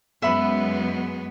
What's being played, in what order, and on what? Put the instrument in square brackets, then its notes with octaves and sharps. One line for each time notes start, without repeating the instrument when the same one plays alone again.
[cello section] F#2 G#3 B3 [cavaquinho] E5 B5